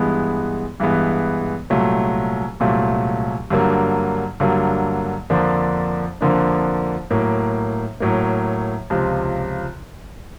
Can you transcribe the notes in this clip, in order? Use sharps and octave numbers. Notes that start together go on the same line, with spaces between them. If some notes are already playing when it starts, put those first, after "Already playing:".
Already playing: G2 E3 G#3 B3
G2 E3 G#3 B3
C2 A#2 F#3 A3
C2 A#2 F#3 A3
G2 D3 F#3 A#3
G2 D3 F#3 A#3
F2 D3 F3 A#3 D4
F2 D3 F3 A#3 D4
A2 F#3 A#3
A2 F#3 A#3
C#2 C3 F3